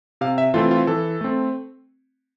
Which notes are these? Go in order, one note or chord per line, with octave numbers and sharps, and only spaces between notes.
C3 F5
E5
E3 A3 C4 F4
F4
E3 A4
A3 C4